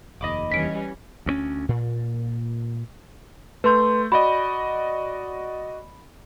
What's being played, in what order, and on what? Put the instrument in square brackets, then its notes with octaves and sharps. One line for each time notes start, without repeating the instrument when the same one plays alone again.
[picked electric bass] F1 D#2 [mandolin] D#5 B5 D6
[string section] E3 G3 C#4 [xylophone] B6 D7
[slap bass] D2 A3 C#4
A#2
[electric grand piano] A3 G6 [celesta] B4 C6
[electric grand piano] F#4 D5 D#5 [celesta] B5